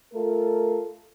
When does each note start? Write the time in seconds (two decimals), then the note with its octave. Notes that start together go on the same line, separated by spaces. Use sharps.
0.14 A3 F4 A4 A#4